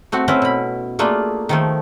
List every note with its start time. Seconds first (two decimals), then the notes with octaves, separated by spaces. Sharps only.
0.12 A3 C4 F#4
0.28 C4 C#4 E4 B4 C5
0.42 B2 B5
0.99 A3 A#3 D4 F4 G#4
1.49 D#3 F3 A3